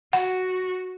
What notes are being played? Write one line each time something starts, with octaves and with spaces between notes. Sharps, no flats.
F#4 F#5